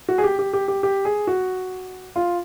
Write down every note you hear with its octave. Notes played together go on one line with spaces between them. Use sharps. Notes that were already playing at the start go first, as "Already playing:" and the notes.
F#4
G#4
G4
G4
G4
G4
G4
G#4
F#4
F4